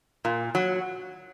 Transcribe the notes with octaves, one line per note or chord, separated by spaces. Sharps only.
A#2
F#3